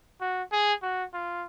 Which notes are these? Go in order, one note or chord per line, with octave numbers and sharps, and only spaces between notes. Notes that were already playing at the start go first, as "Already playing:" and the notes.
F#4
G#4
F#4
F4